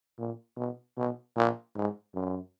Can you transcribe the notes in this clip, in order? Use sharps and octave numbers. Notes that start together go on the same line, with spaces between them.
A#2
B2
B2
A#2
G#2
F#2